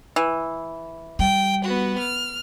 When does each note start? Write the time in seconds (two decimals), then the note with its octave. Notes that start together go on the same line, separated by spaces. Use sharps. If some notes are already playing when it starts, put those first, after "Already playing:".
0.16 E3
1.19 G3 G5
1.65 B3 F#4
1.99 F6